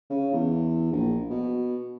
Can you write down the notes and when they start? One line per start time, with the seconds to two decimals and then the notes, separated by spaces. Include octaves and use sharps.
0.10 C#3
0.33 E2
0.92 A#1
1.30 B2